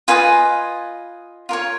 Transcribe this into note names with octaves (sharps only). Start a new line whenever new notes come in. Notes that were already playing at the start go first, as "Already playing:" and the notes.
F4 B4 D#5 G#5
F4 A#4 C#5